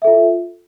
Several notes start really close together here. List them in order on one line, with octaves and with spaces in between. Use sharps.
E5 A4 F4